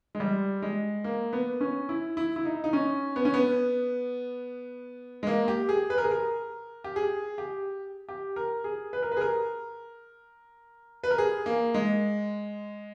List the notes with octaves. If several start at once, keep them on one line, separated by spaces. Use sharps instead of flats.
G#3
G3
G#3
A#3
B3
C#4
E4
E4
E4
D#4
D#4
C#4
B3
C#4
B3
G#3
A#3
G4
G#4
B4
A#4
G#4
A#4
G4
G#4
G4
G4
A#4
G#4
B4
A#4
B4
G#4
A#4
B4
A#4
G#4
A#3
G#3